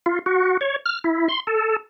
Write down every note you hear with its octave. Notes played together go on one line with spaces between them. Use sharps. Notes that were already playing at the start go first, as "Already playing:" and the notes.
F4
F#4
C#5
F6
E4
C6
A4